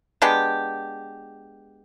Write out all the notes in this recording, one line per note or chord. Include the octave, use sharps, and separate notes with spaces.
G#3 B3 D4 G4